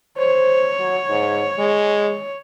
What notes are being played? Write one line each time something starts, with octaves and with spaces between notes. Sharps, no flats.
C5 C#5
F#3
G#2
G#3